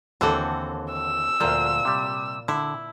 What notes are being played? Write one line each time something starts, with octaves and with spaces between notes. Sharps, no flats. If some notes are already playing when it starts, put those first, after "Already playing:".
D#2 D3 E3 C4 F#4 A4
E6
D2 A#2 F3 F4
C3 G3
D3 E4